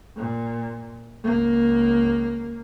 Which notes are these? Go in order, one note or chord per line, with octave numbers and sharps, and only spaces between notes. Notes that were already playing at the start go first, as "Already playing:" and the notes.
A#2
C#2 A#3